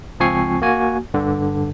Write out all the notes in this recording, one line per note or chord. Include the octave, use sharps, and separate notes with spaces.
C#2 F3 C4 G#5 C#6 C7
A#3 F#4 G#5
G2 D3